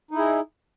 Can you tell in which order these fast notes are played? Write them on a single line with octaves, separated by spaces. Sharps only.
D#4 E4 G#4